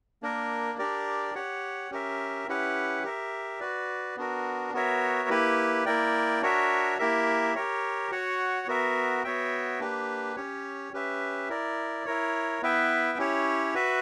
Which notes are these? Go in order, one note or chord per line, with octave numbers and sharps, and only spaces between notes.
A#3 D4 A#4
D4 G4 A#4 D5
G4 C#5 F#5
C#4 G4 A#4 E5
C#4 E4 G4 B4 F#5
G4 A#4 E5
F#4 B4 D5
B3 D4 F#4 A#4
B3 F#4 A#4 C#5 E5
A#3 E4 G4 B4
A#3 E4 A#4 D5 G5
D4 F#4 A#4 C#5 E5
A#3 E4 G4 A#4 E5
G4 A#4 C#5
F#4 C#5 F#5
B3 F#4 A#4 E5
B3 F#4 C#5 E5 G5
A#3 D4 G4 B4
C#4 G4 C#5
C#4 G4 B4 E5
E4 A#4 D5
E4 A#4 C#5
B3 E4 B4 E5 G5
C#4 E4 G4 C#5
F#4 B4 E5